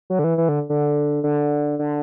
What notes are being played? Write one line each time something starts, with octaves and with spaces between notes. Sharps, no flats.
F#3
D3
E3
E3
D3
D3
D3
D3